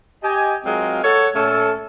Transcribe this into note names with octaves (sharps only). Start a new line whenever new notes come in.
G4 D#5 G#5
F#3 G#3 C4 F4 G#4 A#4
A4 C#5 F#5
A#2 A3 C#4 A4